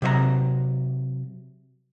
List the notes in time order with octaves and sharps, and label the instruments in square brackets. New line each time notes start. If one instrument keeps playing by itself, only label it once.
[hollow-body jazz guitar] C3 F#3 C#5 A#5